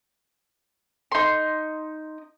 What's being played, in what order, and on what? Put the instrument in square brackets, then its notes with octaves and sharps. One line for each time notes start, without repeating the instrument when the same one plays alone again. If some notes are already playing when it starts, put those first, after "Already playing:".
[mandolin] D#4 C6